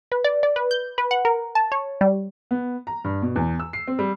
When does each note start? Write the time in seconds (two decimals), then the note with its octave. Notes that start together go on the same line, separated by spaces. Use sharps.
0.12 B4
0.24 D5
0.43 D5
0.56 B4
0.71 G6
0.98 B4
1.11 F#5
1.25 A#4
1.55 A5
1.72 C#5
2.01 G3
2.51 B3
2.87 A#5
3.04 G2
3.22 B2
3.36 E2
3.60 E6
3.73 C7
3.87 C4
3.99 G3